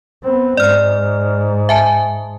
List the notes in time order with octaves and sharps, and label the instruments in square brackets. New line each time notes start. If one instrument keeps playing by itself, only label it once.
[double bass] B3 C4
[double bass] G#2 [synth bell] D5 F6
[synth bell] E5 G#5 A5